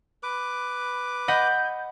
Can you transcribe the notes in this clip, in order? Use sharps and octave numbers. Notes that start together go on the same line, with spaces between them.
B4 D6
D#5 F#5 B5 G6